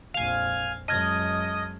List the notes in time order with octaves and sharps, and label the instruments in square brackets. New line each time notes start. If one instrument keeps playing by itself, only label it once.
[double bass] A#1 F2 [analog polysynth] F5 G#5
[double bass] F#2 G#3 [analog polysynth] D#5 [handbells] A5 F6 G#6